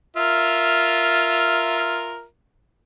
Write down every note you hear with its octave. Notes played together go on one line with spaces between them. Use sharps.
F4 A#4 E5